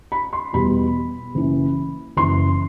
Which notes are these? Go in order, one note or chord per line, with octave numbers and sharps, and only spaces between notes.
B5
C6
E2 B2 G3 B5
F#1 F#2 E3
F#1 F#2 E3 C6